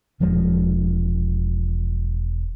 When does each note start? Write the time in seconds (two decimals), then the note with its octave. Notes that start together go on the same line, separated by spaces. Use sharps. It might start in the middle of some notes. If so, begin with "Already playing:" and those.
0.20 E1 F3 G#3